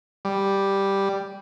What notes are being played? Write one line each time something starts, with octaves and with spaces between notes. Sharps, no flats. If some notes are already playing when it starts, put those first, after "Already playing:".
G3